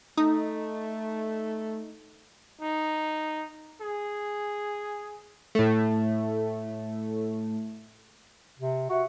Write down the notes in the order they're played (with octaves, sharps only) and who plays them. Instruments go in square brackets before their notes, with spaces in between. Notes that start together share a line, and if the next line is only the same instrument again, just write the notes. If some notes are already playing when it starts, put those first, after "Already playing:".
[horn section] A3 [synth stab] D#4
[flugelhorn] D#4
G#4
[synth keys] A2 A3
[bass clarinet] C3
[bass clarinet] F#4 [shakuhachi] E5